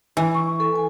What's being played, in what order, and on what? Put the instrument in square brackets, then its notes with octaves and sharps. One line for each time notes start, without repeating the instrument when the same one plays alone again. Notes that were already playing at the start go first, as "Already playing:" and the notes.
[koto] E3
[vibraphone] C#6
A4
G#5